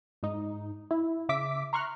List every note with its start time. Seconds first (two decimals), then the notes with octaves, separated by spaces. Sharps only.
0.23 G#2 D#4
0.91 E4
1.29 C#3 E5 D6 B6
1.73 A#5 C6 C#6 F6 F#6